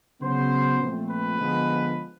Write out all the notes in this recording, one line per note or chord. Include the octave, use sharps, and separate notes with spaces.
C#3 F#3 B3 C5
A#2 F3 A3 C4
B4
D3 F3 G#3 B3